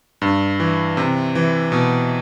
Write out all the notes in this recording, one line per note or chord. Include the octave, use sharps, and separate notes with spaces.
G2
E3
C3
E3
B2